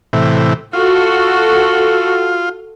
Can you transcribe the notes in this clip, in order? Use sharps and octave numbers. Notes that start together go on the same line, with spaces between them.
A2 C3 E3
F4 F#4 A4